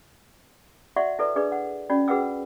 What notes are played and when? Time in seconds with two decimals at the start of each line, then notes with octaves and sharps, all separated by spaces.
0.96 F#4 D5 E5 F#5 C6 C#6
1.19 E4 A4 B4 D5
1.36 D4 G#4 B4 D5
1.52 F#5
1.90 C#4 F#4 D5 B5
2.08 F#4 G#4 B4 F#5 G5 E6